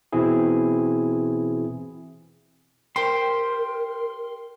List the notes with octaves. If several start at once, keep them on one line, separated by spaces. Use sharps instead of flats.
B2 E3 C4 E4 G#4
G4 A#4 C5 C6